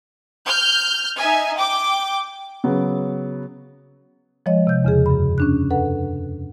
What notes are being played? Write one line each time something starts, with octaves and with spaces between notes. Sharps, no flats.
F6 G6
D#4 E5 G#5
G5 D6
C#3 F#3 B3
F3 G#3 C#5 D#5
C3 G6
E2 C#3 G#4
F#2 B5
C#4 D4 F#6
F#2 A4 B4 F#5